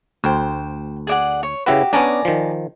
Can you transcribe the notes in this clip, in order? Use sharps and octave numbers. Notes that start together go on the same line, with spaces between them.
D2 C5 G5
G#4 D5 F#5
C#5
C#3 E4 F#4 G4 B4
B3 C#4 D4 D5 G#5 A#5
D#3 F3